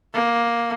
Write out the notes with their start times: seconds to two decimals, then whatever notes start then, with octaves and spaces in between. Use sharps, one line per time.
0.14 A#3